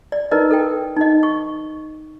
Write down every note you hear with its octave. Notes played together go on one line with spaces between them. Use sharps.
D5
D#4 E4 A#4 B4 D5 D#5
A4 A#4 G5
D#4 D#5
C#6